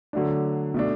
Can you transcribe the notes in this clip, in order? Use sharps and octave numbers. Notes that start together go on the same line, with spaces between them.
D3 F#3 A3 D4
B2 A3 D4